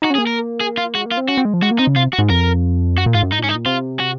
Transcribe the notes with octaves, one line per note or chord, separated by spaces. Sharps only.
D#4 F#4
C#4
G#4
A#3
A#4
G#4
F4
G#3 F#4
A#3
F4
C4
C#4 F#4
C4
G#3
F3
G#3 F#4
A#3
C4 D#4
C#3
C3 F4
F#4
G#2
F2 A#4
F#2 F#4
A#2
G#2 F4
F#2
G#2 D#4
A#2
G#2 C#4
D#4
A#2
C3 F4
F#4